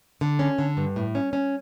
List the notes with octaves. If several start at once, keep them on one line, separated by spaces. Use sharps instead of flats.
D3
C#4
D3
G2
A2
C#4
C#4